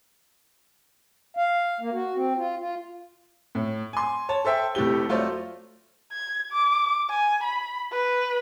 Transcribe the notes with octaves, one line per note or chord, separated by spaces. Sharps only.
F5
A#3
F#4
C4
F4
F4
A2
G#5 C6
C#5 A5
A4 C5 E5 G5
F1 A3 E4 G4 G7
F#3 A3 F4 C5 D5
G#6
D6
G#5
B5
B4